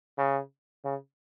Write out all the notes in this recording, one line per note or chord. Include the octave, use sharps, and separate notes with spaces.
C#3
C#3